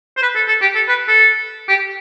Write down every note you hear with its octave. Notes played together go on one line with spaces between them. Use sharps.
C5
B4
A4
A4
G4
A4
B4
A4
G4